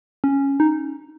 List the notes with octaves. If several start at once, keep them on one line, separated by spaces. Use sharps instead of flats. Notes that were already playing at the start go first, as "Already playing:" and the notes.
C#4
D#4